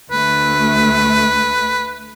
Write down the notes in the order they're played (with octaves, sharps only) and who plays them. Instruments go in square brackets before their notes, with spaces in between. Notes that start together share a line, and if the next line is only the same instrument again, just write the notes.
[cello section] D2 A3 [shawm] B4